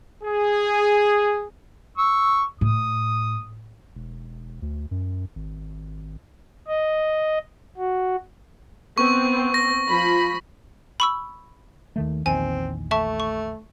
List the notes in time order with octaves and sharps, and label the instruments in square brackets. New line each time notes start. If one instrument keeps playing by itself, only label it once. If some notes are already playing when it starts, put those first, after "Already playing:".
[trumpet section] G#4
[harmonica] C#6 E6
[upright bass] A2 [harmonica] D#6
[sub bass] E1
D2
F#2
G#1
[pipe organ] D#5
F#4
[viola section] B3 C4 [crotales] C#6
[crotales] A#6
[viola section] F3 B5
[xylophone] B5 C#6 E6
[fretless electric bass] D#2 D#3 A3
[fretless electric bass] A#1 E2 D#3 [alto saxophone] C4 [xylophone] G#5
[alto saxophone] A3 [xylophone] E5 A5 C#6
[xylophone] C#6